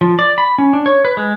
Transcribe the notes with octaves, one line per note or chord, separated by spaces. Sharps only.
F3
D5
B5
C#4
D4
C#5
B4
G#3